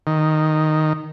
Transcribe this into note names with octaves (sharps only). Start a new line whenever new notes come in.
D#3